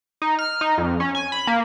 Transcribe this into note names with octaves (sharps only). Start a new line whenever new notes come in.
D#4
F6
D#4
F2
C#4
G#5
B5
A#3